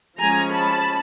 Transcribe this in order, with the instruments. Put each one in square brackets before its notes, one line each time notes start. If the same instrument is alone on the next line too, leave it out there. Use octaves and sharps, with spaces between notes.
[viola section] F3 G#3 C#4 G#5 A#5
A5 B5